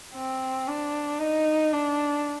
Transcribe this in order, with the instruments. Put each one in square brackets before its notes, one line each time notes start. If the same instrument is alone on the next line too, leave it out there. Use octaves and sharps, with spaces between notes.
[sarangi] C4
D4
D#4
D4